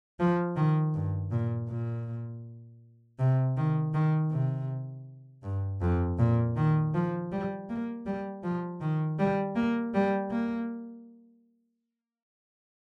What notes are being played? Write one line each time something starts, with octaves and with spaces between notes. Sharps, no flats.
F3
D#3
G2
A#2
A#2
C3
D#3
D#3
C3
G2
F2
A#2
D#3
F3
G3
A#3
G3
F3
D#3
G3
A#3
G3
A#3